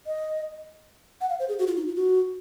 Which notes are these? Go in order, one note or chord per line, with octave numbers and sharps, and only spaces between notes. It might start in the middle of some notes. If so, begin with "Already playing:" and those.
D#5
F#5
F5
C5
G#4
F#4
F4
D#4
F4
F#4